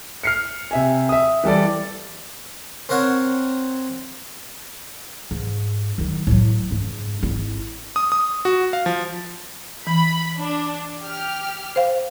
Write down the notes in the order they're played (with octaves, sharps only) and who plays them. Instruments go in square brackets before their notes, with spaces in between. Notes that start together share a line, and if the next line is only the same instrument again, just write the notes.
[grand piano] F6 C7 C#7
C3 E5 G#5
E5 D#6
E3 G3 A4 D5
[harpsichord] C4 A#4 C#5 F#5
[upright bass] G#2
D#3 F#3
A2 F#3
F#1 G#2
G#1 E4
[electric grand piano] D#6
D#6
F#4
F5
F3
[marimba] E3 [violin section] B5
[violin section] D4
G4 F6
[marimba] C5 F5